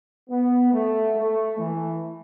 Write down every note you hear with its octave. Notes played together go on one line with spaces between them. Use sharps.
B3
A3
A3
E3